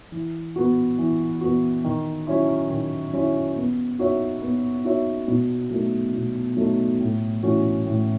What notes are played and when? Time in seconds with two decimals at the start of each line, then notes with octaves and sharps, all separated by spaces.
0.12 E3
0.56 B3 F#4
0.98 E3
1.41 B3 F#4
1.84 D#3
2.27 F#3 C#4 E4
2.70 D#3
3.13 F#3 C#4 E4
3.56 B3
3.99 D#4 F#4 C#5 E5
4.42 B3
4.85 D#4 F#4 C#5 E5
5.28 B2
5.70 F#3 A3 D#4 A4
6.14 B2
6.57 F#3 A3 D#4 A4
7.00 A2
7.43 E3 A3 C#4 F#4
7.86 A2